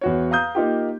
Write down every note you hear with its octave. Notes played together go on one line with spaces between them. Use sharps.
E2 F#4 C#5
F5 A#5 D#6 G6
A#3 D#4 F4 G4